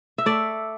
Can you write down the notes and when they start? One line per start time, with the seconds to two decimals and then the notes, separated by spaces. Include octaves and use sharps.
0.18 E5
0.26 A3 D5